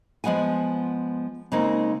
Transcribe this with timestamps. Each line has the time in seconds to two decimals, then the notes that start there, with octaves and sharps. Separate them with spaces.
0.24 F3 G#3 B3 F#5 G#5
1.52 C#3 G#3 A#3 C4 D#4